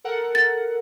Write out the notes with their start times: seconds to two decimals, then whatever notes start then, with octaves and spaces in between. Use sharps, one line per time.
0.04 A4 A#4 F#5
0.35 A6